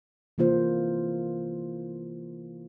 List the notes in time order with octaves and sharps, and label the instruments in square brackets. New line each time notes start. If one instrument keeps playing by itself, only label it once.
[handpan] C3 E3 A#3 F4 C5